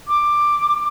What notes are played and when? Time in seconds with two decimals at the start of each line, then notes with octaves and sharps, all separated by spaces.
0.08 D6